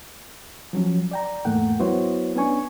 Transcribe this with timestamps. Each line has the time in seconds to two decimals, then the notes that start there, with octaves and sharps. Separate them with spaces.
0.73 F3 F#3 C#4
1.11 D5 G5 A#5
1.45 E2 G#2 A3 A#3 F#5 G5
1.79 F#3 B3 E4 F#4 C5 C#5
2.35 B3 C#4 D4 G#5 C#6